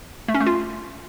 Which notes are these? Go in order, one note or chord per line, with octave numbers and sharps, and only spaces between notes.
A3
C#4
A3
F4